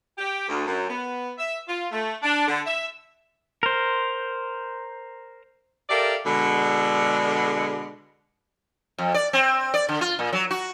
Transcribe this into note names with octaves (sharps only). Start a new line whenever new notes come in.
G4
D2
F#2
B3
E5
F4
A3
D4
D3
E5
A#4 C5
G4 A4 A#4 D5 E5 F5
B2 D3 G#3
F2
D5
C4
D5
D3
F4
A#2
F#3
F#4